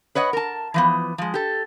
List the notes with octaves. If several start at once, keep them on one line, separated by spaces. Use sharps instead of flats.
B4 C#5 D#5 F#5
A#4 A5
E3 F3 B3
F3 G#3
G4 A4